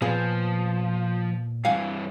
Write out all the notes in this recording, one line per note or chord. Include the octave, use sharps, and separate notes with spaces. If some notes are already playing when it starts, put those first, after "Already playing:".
A#2 F3 B3 G#4
G2 E3 F5 F#5 G#5